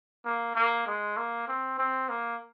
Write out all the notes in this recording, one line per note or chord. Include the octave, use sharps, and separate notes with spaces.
A#3
A#3
G#3
A#3
C4
C4
A#3